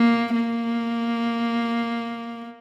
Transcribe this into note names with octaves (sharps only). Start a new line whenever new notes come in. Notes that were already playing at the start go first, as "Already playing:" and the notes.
Already playing: A#3
A#3